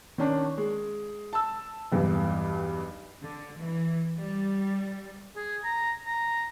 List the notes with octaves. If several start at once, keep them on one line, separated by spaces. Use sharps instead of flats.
D#3 C#4 D4
G#3
A5 E6
B1 E2 G2
D3
E3
G3
G#4
A#5
A#5